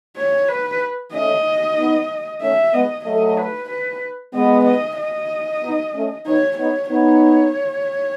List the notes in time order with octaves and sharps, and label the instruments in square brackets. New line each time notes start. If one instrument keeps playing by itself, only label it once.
[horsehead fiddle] C#5
B4
[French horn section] A3 C#4 [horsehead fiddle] D#5
[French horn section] B3 D#4
[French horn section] A3 C#4 [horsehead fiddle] E5
[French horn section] G#3 B3 [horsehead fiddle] D#5
[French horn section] F#3 A3 [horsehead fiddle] D#5
[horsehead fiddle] B4
B4
[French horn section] G#3 B3 [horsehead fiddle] D#5
[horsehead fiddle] D#5
D#5
[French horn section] B3 D#4
A3 C#4
[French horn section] B3 D#4 [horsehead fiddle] C#5
[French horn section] B3 D#4 [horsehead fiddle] C#5
[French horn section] B3 D#4 [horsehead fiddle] C#5